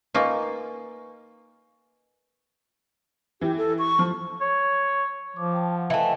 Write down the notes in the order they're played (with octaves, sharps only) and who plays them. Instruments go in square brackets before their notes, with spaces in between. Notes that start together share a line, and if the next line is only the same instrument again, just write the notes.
[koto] A#3 D#4 F4 [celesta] B4 G#5 C#6
[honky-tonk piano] E3 [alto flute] G4
[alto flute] A4
C#6
[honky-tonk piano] F3
[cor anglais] C#5
[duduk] F3 [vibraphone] D6
[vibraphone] G5 A5
F#5
[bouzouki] E3 A3 [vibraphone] D#5 F5 G5